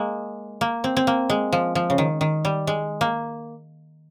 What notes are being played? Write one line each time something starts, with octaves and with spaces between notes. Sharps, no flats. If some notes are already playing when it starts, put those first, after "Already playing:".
Already playing: G#3 A#3
A#3
C4
C4
A#3
G#3
F3
F3
C#3
D#3
D#3
G3
G#3
A#3